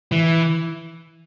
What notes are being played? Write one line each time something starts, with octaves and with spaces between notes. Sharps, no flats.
E3